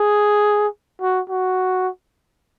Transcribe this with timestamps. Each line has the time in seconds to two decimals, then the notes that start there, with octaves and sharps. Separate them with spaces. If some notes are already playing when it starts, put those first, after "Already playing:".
Already playing: G#4
1.01 F#4
1.29 F#4